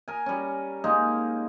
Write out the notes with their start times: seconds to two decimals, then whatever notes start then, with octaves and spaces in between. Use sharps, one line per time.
0.08 A#4 G#5
0.26 G3 C#4
0.84 G#3 A#3 D#4